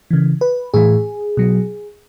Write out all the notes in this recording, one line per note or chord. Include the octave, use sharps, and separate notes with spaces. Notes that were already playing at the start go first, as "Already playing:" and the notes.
C#3 E3
B4
A2 E3 G#4
B2 F#3